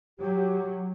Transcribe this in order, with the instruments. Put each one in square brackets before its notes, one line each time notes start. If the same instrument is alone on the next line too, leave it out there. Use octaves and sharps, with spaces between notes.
[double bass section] F#3 [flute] G4